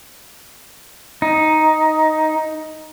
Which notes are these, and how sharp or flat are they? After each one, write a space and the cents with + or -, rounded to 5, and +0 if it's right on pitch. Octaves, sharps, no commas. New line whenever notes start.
D#4 +5